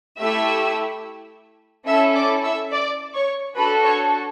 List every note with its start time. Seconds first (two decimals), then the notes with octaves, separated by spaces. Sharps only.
0.19 A3 E4 G4 E5 E6
1.87 C#4 E4 A4 E5 E6
2.15 D5 D6
2.44 E5 E6
2.71 D5 D6
3.14 C#5 C#6
3.56 D4 F#4 A4 B4 B5
3.84 C#5 C#6